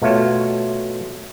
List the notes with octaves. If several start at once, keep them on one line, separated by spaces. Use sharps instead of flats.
B2 A3 F4 C#5